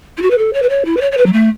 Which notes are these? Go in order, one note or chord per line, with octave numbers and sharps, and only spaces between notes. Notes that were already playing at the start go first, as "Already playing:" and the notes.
E4
F#4
B4
A4
C#5
B4
C#5
E4
B4
C#5
C#5
B4
F#3
A3